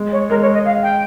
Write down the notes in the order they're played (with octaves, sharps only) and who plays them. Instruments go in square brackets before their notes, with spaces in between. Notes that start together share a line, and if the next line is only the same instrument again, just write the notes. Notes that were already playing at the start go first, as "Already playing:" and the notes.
Already playing: [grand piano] G#3
[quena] C#5
[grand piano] G#3 [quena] A#4
[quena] C#5
D#5
F5
G5